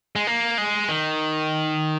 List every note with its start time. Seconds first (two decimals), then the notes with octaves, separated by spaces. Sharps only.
0.16 G#3
0.27 A#3
0.58 G#3
0.89 D#3